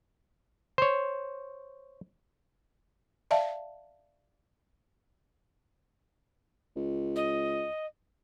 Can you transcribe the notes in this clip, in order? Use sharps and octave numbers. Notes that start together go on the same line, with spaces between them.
C5 C#5
D5 E5 F5 A5
C#2
D#5